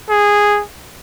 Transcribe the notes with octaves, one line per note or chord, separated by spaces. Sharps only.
G#4